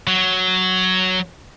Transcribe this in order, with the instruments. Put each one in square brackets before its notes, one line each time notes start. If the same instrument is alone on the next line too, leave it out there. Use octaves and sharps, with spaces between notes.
[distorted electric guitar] F#3